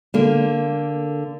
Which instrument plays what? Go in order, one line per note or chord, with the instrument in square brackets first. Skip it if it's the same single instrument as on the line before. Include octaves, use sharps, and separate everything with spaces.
[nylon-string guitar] D3 A#3